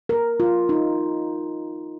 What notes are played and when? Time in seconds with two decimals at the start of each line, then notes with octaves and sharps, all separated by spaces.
0.09 A#4
0.40 F4
0.69 D#4